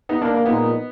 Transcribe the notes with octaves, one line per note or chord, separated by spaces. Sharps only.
B3 D#4
A#3 D4
A#3
A#2 F3 G#3 B3 D#4